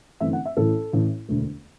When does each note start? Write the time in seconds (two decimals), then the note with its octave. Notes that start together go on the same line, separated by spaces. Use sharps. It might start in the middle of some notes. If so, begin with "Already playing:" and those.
0.20 G1 F#2 E3 A3 C4 E5
0.33 F#5
0.45 E5
0.57 A1 A2 E3 A4
0.93 A1 A2 E3
1.29 E1 D2 D3 A3